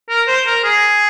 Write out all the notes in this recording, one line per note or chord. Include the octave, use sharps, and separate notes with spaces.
A#4
C5
A#4
G#4